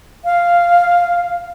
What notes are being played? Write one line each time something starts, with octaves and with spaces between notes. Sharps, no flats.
F5